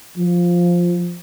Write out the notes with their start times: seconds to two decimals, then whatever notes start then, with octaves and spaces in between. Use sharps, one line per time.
0.16 F3